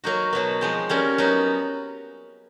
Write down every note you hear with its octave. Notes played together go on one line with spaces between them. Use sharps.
F#3 A#3 D#4 F#4
B2 F#3 B3
F3 G#3 C4
G3 A#3 C#4 F#4
F#3 B3 D#4